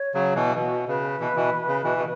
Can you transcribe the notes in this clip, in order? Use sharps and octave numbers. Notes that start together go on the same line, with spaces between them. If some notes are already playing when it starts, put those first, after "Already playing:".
Already playing: C#5
C#3 F#3
B2 E3
B2 F#4
C#3 B4
B2 E3
B2 E3
C#3
B2 E3
B2